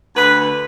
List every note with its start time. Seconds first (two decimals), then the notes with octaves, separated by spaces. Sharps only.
0.16 D2 D3 B4